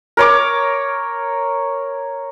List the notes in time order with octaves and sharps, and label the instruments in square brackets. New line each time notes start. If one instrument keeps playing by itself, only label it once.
[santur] A#4 C#5 D6